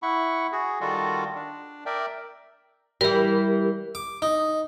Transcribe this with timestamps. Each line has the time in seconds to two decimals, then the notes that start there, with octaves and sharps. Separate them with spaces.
0.03 E4 F#5 B5 C#6
0.52 F#4 G#4
0.81 D#3 G3 F4 F#4 A4
1.35 D4
1.86 A#4 D5 E5 G5
3.01 E3 G3 G4 A#4
3.95 D6
4.22 D#4